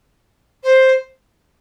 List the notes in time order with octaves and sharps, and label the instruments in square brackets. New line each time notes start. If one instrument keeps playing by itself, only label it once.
[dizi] C5